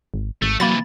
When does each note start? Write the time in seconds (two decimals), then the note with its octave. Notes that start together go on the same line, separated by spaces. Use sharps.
0.14 G#1
0.42 G#1 A3
0.60 C3 E3 F#3 A#3 B5 A6